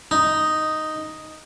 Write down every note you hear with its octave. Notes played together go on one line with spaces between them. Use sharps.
D#4